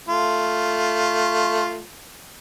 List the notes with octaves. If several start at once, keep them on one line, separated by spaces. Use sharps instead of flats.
A3 F4